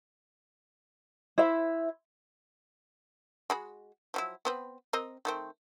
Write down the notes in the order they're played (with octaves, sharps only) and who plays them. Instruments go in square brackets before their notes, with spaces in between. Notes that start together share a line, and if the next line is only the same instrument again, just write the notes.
[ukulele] E4 C5 E5
[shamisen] G#3 F#4 B5
F3 F#3 E4
B3 C4 B4
C4 A#4 D#5
D#3 A3 C4